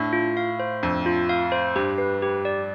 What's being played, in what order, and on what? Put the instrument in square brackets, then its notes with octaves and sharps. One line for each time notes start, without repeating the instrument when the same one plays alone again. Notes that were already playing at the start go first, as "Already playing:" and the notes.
Already playing: [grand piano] A2 [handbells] D4
[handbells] F4
F5
C5
[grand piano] F2 [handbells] D4
[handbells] F4
F5
C5
[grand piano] G2 [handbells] G4
[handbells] B4
G4
D5